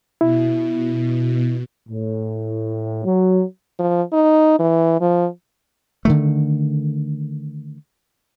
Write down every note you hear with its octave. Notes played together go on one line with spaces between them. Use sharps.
B2 E4
A2
F#3
F3
D#4
E3
F3
D3 D#3 A3